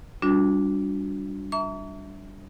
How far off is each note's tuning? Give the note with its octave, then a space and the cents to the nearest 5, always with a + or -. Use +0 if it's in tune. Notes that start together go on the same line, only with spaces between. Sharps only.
G3 +0 D4 -20 F#4 -40
E5 -15 A#5 -30 C#6 +45